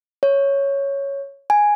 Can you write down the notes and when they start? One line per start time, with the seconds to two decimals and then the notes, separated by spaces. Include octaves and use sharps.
0.23 C#5
1.50 G#5